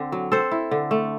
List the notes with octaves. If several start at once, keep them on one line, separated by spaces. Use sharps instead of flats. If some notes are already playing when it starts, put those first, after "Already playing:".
Already playing: D3 C4
F#3
C4 A4 C5
E4
D3
A3